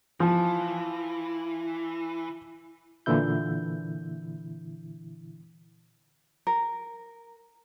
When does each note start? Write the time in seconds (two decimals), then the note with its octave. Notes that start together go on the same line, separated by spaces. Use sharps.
0.20 E3 F3
3.06 A#2 D3 E3 E4 G6
6.47 A#4